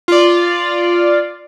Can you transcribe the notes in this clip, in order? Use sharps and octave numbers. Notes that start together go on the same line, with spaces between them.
F4 D5